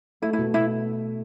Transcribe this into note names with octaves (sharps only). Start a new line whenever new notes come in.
A3 E4
E4
B2
B2 E4